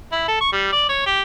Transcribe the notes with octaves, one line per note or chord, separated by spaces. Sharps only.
E4
A4
C#6
G3
D5
C#5
G4